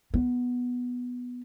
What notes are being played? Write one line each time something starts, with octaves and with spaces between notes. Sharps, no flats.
B3